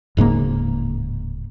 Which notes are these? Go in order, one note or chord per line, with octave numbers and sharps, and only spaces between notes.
D1 G#2 C#3 A#3